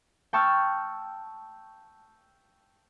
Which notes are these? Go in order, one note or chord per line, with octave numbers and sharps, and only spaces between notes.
G5 A5 C#6 E6 F6 A6